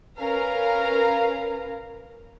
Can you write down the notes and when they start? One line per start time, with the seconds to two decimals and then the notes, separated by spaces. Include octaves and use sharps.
0.18 C#4 A#4 B4 F5 A#5